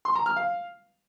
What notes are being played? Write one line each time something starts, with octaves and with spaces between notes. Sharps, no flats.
C6
A#5
F6
F5